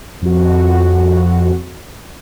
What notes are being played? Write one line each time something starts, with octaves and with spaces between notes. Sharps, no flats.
F2 F#4